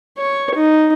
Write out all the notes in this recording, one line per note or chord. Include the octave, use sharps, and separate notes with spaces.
C#5
D#4